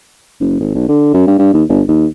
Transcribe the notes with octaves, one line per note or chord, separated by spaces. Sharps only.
F#1
G#1
B1
D3
F#2
G2
G2
D#2
G1
D#2